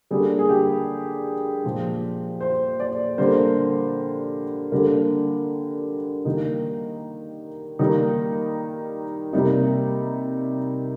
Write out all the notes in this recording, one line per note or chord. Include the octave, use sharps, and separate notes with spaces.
D3 G3 A#3 G#4
G#4
G4
A#2 F3 G#3
C5
D5
D3 G3 A#3 C5
D3 G3 A#3 A#4
D#3 G3 A#3 D#4
D#3 G3 A#3 D#4
C3 G3 A#3 D#4